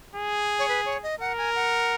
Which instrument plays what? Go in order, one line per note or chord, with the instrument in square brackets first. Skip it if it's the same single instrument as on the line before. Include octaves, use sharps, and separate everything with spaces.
[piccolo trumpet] G#4
[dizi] C#5
B4
C#5
D#5
[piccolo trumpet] A#4 [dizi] F#5
[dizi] G#5
F#5